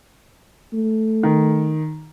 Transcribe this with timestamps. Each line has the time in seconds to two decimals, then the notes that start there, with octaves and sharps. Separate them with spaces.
0.73 A3
1.23 D#3